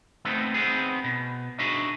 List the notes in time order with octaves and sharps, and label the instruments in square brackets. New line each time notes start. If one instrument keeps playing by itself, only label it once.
[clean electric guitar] A3 B3 C4 D#4
B3 C4 D#4 F4 G#4
B2
D4 D#4 F#4 G#4 D#5 E5